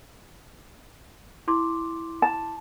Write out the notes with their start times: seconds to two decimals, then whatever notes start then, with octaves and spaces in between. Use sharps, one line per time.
1.48 E4 C6 D6
2.22 A5